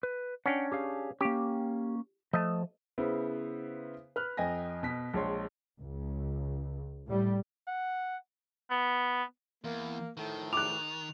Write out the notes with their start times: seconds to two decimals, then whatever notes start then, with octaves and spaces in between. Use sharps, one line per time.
0.03 B4
0.46 C#4 D4 F#5 G5
0.72 G4 G#4 F5
1.21 A#3 C#4 G4
2.33 F3 A3 D#5 E5 A5
2.98 C#3 B3 E4 C5
4.16 B4 F6 F#6
4.37 F2 D#5 G5 G#5 A#6
4.83 B2 B6
5.14 A#1 G#3 C#5 C6
5.79 C#2
7.07 A2 G3
7.68 F#5
8.70 B3
9.64 E2 A#3
10.17 A2 D#3 F3 A3
10.53 D6 F#6 F7